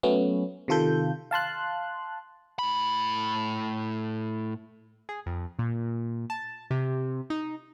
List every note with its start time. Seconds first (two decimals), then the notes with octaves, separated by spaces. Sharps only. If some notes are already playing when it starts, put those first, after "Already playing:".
0.03 F#3 A3 B3 C#4
0.68 C3 D#3 F4 A4 G6
1.31 F5 A5 C6 F#6
2.59 A2 B5
5.09 G#4
5.26 F2
5.59 A#2
6.30 A5
6.71 C3
7.30 D#4